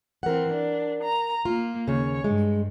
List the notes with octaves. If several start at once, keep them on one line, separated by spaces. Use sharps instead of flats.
E3 C4 A#4 F#5
D4
A#5
A#3 F4
D#2 C#3 C#5
G2 G#3